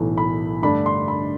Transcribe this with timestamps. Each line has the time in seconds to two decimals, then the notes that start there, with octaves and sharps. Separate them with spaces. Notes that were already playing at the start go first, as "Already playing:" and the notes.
Already playing: B1 A2 E3 A3
0.18 B5
0.62 G2 D3 A3 D4 B5
0.86 C6
1.08 B5